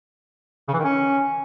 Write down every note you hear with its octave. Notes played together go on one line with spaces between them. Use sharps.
C#3
E3
D#3
C#4